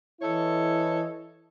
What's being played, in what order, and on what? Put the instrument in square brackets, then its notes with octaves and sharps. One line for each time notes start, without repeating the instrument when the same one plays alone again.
[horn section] E3 E4 A4 C#5 D#5